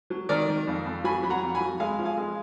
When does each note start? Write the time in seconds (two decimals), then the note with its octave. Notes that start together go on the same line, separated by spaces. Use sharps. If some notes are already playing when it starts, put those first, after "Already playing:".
0.10 F#3
0.29 D#3 A#4 D5
0.49 D#3
0.68 F2
0.86 F2
1.04 F#3 G#5 B5
1.23 F#3 B5
1.30 F#5 A#5
1.43 F2
1.55 G#5 B5
1.60 F#3
1.80 G#3 F5 G#5
1.99 F3
2.05 F5 G#5
2.17 G#3